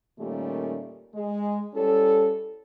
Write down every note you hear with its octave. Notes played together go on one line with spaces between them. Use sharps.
A#2 D#3 G3 A3 A#3 C#4
G#3
G3 C#4 E4 A4